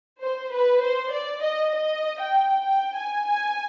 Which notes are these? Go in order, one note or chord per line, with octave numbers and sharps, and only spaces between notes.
C5
B4
C5
D5
D#5
D#5
G5
G5
G#5
G#5